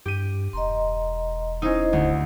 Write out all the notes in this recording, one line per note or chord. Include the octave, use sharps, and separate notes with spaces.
G2 G4 D#7
E1 D#5 A#5 C6
C#4 D#4 E4 C5 D#5
D2